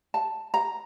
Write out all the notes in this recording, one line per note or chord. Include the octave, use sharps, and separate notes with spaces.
A5
A#5